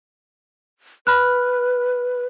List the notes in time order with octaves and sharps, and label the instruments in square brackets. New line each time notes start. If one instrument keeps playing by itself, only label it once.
[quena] B4 [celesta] B5 F6 F#6